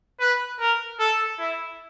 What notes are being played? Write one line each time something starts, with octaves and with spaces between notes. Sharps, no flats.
B4
A#4
A4
E4